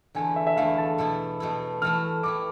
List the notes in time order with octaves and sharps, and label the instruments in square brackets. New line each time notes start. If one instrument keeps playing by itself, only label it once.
[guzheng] E2 D3 A3 E4 [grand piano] G#5
[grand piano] E5
E5
[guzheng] E2 D3 A3 E4 [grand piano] F5
[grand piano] A5
[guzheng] B2 A3 E4
B2 A3 E4
[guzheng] E3 A3 E4 [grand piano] F6
[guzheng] E3 A3 E4 [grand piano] D6